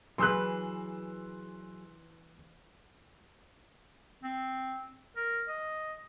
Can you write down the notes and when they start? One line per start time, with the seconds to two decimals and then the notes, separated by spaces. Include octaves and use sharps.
0.18 E3 F#3 G#4 B4 C6 E6 F#6
4.23 C4
5.16 A#4
5.48 D#5